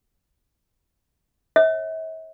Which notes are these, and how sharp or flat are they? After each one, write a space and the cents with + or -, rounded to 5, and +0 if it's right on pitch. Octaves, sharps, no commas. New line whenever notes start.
C#5 -25 E5 -40